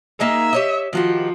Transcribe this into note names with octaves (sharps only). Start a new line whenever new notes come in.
A#3 D#4 G#4 E5
G4 C#5 D#5
D#3 F3 F#4 G4